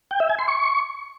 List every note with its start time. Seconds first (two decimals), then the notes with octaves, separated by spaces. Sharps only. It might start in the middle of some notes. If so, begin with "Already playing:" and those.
0.11 G5
0.20 E5
0.29 G#5
0.39 C6
0.48 C#6